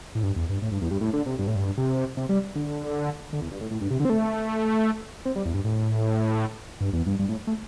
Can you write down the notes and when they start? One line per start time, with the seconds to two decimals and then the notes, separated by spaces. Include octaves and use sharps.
0.15 A2
0.23 G2
0.36 E2
0.49 G2
0.62 A2
0.72 G2
0.81 E2
0.91 G2
1.01 A2
1.13 D3
1.26 C3
1.39 G2
1.47 A2
1.55 G2
1.77 C3
2.17 C3
2.29 G3
2.56 D3
3.33 D3
3.41 E2
3.51 G2
3.61 A2
3.71 A2
3.81 G2
3.91 C3
4.00 D3
4.05 C4
4.10 A3
5.25 C4
5.36 G3
5.45 E2
5.54 G2
5.64 A2
6.81 G2
6.93 E2
7.06 G2
7.19 G2
7.29 A2
7.47 A3